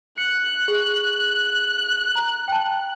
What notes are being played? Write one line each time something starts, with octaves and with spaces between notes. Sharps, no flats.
F#6 C#7
G#4
A#5
G5 A5